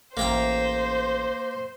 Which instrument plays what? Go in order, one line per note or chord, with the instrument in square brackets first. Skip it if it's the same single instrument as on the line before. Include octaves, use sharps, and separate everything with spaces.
[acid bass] A1 [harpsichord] A#3 G5 A#5 [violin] C5